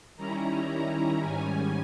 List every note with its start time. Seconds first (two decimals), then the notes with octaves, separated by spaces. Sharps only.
0.16 D#3 G3 C#4 E4 A#5
0.67 A#5
1.19 G#2 D#3 G3 C#4 G#5